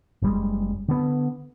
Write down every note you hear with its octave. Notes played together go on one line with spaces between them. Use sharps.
F#1 G3 G#3
D3 B3